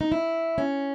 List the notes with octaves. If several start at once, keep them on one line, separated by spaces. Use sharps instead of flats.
D#4
E4
C#4